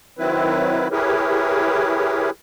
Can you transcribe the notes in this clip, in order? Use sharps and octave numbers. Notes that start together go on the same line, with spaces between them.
D#3 F#3 C4 E4 B4
E4 G4 G#4 A#4 B4 C#5